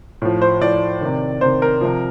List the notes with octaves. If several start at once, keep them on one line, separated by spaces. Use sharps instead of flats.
A2 F3
C5
A2 F3 D5
C3 D#3
C3 D#3 C5
A#4
C3 F3